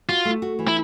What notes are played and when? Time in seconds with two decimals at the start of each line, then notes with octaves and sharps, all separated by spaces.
0.09 F4 F#4
0.25 A3
0.42 F#4
0.59 E3
0.68 E4